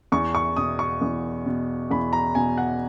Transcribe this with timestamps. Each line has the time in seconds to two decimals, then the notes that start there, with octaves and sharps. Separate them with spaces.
0.12 E2 C#6
0.35 C#6
0.57 B2 D#6
0.79 C#6
1.01 E2
1.46 B2
1.91 E2 B5
2.13 A#5
2.35 B2 G#5
2.58 F#5